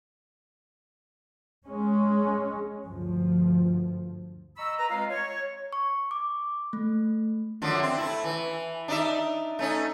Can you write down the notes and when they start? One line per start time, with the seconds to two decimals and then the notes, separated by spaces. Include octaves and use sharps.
1.64 G#3 C#4
2.85 D2 G2 F3
4.57 D#5 A#5 B5 C#6 E6
4.79 B4 A#5
4.90 G#3 C4 F4 C#5 D#5 F5
5.10 C#5
5.73 C#6
6.11 D6
6.73 A3
7.62 F#2 D3 F3
7.83 C4
7.97 A3 E4
8.24 E3
8.88 D4 D#4 E5
9.59 A3 C#4 D#4